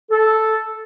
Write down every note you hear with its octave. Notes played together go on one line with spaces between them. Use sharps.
A4